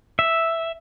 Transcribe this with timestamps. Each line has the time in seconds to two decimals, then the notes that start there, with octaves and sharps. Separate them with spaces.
0.19 E5